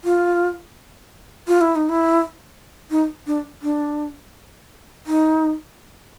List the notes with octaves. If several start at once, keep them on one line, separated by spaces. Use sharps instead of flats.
F4
F4
E4
D#4
E4
D#4
D4
D4
D#4